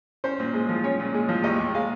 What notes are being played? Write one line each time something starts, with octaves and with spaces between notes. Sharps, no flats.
C#4 C5
A#2
G#3
F3
C#4 C#5
A#2
G#3
F3
D#2 D#5
D#2
G#3 F5